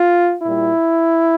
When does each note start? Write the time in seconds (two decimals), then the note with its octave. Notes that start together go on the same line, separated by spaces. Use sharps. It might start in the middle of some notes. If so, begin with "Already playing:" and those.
Already playing: F4
0.44 A#2 G3 E4